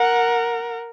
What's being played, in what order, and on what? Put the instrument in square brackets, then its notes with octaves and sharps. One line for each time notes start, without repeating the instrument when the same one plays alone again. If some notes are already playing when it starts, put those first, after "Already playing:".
Already playing: [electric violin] A#4 [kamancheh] F#5